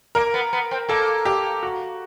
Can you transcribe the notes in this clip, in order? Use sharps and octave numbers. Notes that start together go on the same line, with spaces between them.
A#3 A#4
B3
B3
C4
A#3 A4
G4
F#4